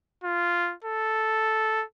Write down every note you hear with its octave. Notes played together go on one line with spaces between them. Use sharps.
F4
A4